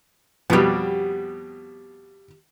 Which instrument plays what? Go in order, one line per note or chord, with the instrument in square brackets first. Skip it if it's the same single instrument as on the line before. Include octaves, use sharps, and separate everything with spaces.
[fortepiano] F2 B2 G3 [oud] B3 G4